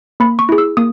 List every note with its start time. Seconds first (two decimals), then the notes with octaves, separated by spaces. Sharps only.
0.20 A#3 B5
0.39 C#6
0.49 E4 G#4
0.58 E6
0.77 A#3 D#6